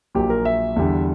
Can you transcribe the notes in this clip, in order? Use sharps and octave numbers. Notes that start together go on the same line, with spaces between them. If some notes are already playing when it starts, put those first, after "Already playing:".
A#1 A#2 F#3 A#3 G4
A#4
E5
E2 D3 G3